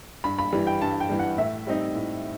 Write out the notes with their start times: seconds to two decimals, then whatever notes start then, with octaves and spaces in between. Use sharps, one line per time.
0.24 G2 B5
0.39 B5
0.52 E3 G3
0.67 G5
0.81 G2 A5
1.00 G5
1.09 E3 G3
1.19 F#5
1.38 A2 E5
1.67 G3 C4 D#4
1.95 A2